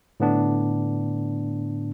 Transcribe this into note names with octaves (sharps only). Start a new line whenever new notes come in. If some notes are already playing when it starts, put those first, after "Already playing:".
A2 D3 B3 D4